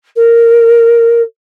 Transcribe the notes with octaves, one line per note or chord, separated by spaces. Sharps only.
A#4